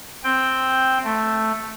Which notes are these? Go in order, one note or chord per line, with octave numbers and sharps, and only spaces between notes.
C4 G5
A3